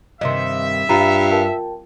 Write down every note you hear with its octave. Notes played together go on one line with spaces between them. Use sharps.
G2 C3 D#3 D#5 E5 C6
G2 F4 A#5 B5
A#4 G5 A5